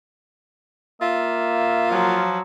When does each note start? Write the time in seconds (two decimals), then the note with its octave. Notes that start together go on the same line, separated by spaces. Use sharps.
1.01 A#3 F4 E5
1.91 F3 F#3